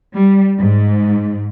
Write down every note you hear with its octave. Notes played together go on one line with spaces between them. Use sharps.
G3
G#2